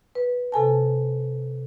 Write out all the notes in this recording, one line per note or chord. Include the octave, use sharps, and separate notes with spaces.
B4
C3 A4 G#5 A5